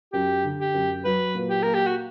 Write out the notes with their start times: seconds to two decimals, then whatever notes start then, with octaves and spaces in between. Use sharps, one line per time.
0.13 F#2 G4
0.44 D3
0.59 G4
0.74 F#2
1.05 F#3 B4
1.35 A#2
1.50 G4
1.63 A#3 A#4
1.74 G4
1.87 F#4